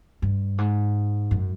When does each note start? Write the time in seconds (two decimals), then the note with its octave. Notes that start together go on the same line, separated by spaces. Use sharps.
0.22 G2
0.58 G#2
1.31 F#2